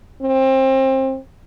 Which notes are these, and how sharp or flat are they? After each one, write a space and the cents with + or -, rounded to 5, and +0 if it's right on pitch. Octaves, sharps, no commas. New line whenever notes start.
C4 +25